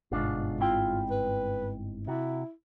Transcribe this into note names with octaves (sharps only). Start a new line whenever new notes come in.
G1 G#2 B2 D4 F4
C4 E4 F4 G5
B4
C3 E4 F#4